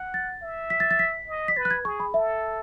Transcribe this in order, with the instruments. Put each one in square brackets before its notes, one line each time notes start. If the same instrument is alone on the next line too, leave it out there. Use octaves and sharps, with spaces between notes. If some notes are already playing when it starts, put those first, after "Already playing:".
Already playing: [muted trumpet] F#5
[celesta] A6
[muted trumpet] E5
[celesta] B6
A6
A6
B6
[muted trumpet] D#5
[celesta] B6
[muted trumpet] B4 [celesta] A6
[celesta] F#6
G#6
[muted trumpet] G#4 [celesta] C#6
[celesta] B5
[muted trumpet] A4 [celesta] E5